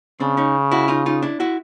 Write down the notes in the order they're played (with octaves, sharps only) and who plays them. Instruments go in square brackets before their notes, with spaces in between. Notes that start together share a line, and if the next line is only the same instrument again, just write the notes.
[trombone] C#3 [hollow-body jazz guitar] C4 D4
[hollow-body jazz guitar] C#4 D#4
E4 F#4
D#4 F4
D#4 F4
D4 E4
E4 F#4